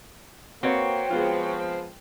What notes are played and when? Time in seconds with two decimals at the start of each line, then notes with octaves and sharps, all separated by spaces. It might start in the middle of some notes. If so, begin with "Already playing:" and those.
0.63 A#3 C4 F#4 B4 C#5
1.10 F3 G#3 B3 F4